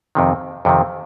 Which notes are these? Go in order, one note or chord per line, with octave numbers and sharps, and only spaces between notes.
F2 C3 D#3
F2 C3 D#3